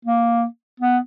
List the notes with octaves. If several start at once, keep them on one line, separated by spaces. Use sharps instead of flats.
A#3
B3